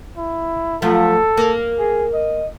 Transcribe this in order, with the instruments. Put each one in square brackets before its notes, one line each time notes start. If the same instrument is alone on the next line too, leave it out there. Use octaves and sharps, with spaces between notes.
[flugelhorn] E4
[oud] F3 F#3 A3 [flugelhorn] A4
[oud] A#3
[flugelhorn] G#4
D#5